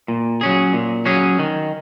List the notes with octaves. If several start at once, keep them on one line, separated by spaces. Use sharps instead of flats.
A#2
F#3 C#4 G#4
A#2
F#3 C#4 G#4
D#3